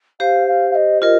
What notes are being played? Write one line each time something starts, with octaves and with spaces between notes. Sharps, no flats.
G4 C5 F5
F5
F5
D#5
F4 A#4 D#5